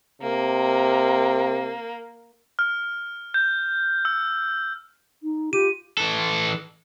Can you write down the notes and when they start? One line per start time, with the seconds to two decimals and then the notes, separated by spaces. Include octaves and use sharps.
0.22 C3 A#3
2.59 F6
3.34 G6
4.05 E6
5.23 D#4
5.53 F4 G4 D#7
5.98 E3 A4